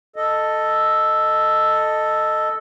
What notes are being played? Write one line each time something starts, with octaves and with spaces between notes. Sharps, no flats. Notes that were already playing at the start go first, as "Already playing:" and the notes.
A4 D#5